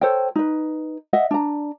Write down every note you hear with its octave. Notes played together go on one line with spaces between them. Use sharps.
A4 C5 C#5 G5
D#4 B4
D#5 E5 F#5
D4 A#5